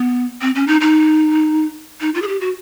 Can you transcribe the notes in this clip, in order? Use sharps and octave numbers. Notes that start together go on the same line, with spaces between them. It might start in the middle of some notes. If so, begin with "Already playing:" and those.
Already playing: B3
C4
C#4
D#4
D#4
D#4
F4
G#4
G4
F#4